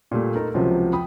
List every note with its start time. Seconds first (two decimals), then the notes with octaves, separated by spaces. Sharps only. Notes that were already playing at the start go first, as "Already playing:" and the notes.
0.11 A#2 G3 A3
0.35 D#4 A4 A#4
0.54 C#2 C3 F3 F#3
0.92 C4 G5 B5 D#6